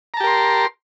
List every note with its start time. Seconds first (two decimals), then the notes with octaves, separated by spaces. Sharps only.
0.14 A#5
0.17 A5
0.20 G4
0.24 A#4
0.27 C6